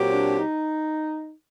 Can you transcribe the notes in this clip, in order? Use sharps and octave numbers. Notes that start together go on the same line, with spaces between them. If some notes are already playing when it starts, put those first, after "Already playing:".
Already playing: A#2 F#3 C4 G4
D4
D#4